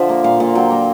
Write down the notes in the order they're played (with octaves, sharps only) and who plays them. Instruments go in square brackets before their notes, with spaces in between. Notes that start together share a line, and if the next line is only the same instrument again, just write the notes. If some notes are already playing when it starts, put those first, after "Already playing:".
Already playing: [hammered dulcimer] D3 F3 E5
A#3
A#2 F5
A#2
F#3 G5
A#3